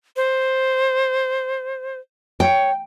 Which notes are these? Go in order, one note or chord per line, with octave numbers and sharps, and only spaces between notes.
C5
C#5 G5